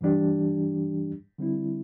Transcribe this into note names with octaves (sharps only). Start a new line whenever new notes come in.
G2 E3 G3 D4 G4
D3 G3 C4 E4